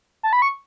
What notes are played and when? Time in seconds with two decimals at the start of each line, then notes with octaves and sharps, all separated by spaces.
0.23 A5
0.33 B5
0.42 C#6